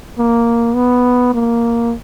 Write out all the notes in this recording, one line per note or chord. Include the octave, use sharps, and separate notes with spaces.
A#3
B3
A#3